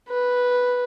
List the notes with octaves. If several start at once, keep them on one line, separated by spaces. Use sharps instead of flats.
B4